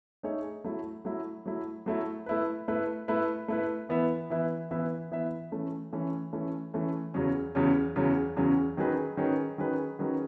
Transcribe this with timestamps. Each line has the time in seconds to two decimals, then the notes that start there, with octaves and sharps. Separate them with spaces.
0.23 A3 D#4 G#4 C#5 E5
0.64 F#3 A3 E4
1.05 F#3 A3 E4
1.46 F#3 A3 E4
1.86 F#3 A3 E4
2.26 A3 E4 B4
2.68 A3 E4 B4
3.08 A3 E4 B4
3.48 A3 E4 B4
3.89 E3 B3 E4 B4 E5
4.30 E3 B3 E4 B4 E5
4.71 E3 B3 E4 B4 E5
5.11 E3 B3 E4 B4 E5
5.52 E3 A3 C#4
5.92 E3 A3 C#4
6.33 E3 A3 C#4
6.74 E3 A3 C#4
7.14 E2 C#3 F#3 C#4
7.55 E2 C#3 F#3 C#4
7.96 E2 C#3 F#3 C#4
8.36 E2 C#3 F#3 C#4
8.77 D#3 F#3 C#4 G#4 B4
9.17 D#3 F#3 C#4 G#4 B4
9.58 D#3 F#3 C#4 G#4 B4
9.99 D#3 F#3 C#4 G#4 B4